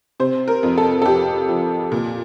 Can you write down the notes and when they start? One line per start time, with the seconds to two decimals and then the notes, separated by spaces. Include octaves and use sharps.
0.20 C3 C5
0.48 A#4
0.63 F2
0.78 A4
1.02 A4
1.05 F2 G4
1.49 F3
1.92 A#2